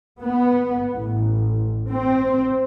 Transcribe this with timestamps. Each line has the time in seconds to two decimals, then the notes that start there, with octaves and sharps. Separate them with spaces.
0.21 B3
0.95 A1
1.90 C4